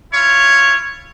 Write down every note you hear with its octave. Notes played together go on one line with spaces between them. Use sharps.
E4 F4 C#5